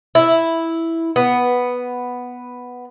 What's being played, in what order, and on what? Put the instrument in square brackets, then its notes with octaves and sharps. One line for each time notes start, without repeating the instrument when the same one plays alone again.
[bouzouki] E4
B3